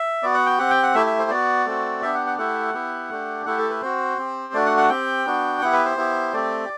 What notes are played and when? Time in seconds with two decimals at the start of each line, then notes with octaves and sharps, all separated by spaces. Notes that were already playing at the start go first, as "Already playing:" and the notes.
Already playing: E5
0.23 B3 F#4 D5
0.34 F#5
0.46 G5
0.58 C4 G4 F#5
0.71 G5
0.83 F#5
0.95 A3 E4 G4 E5
1.06 E5
1.19 C5
1.30 B3 F#4 D5
1.66 A3 C4 F#4
2.02 B3 D4 G4 E5
2.14 F#5
2.26 F#5
2.38 A3 E4 G4 F#5
2.74 B3 E4 G4
3.10 A3 D4 G4
3.46 A3 E4 G4 F#5
3.58 A4
3.69 B4
3.82 C4 F#4 C5
4.18 C4 G4
4.54 A3 D4 F#4 D5
4.66 F#5
4.77 F#5
4.89 C4 G4 G5
5.26 B3 D4 F#4
5.61 B3 E4 G4 F#5
5.73 B4
5.85 C5
5.97 B3 E4 G4
6.33 A3 C4 G4 D5